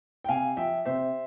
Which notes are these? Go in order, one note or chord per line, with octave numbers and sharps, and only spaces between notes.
G5
C3 F5 G#5
F3 E5 G5
C3 C5 E5